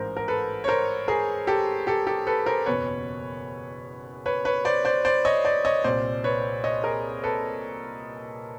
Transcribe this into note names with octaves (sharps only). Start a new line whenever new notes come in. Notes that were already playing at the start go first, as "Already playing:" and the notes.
Already playing: A1 G#2 E3 A#4 C5
A#4
A4 B4
C#5
A#4 C5
G#4 A#4
G4 A4
G4 A4
G4 A4
A4 B4
A#4 C5
F#1 E2 B2 B4 C#5
B4 C#5
B4 C#5
C5 D5
C5 D5
C5 D5
C#5 D#5
C5 D5
C#5 D#5
C2 A#2 C5 D5
B4 C#5
C#5 D#5
G#4 A#4
A4 B4